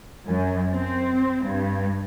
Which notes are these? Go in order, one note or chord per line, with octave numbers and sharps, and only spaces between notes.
F#2
C4
G2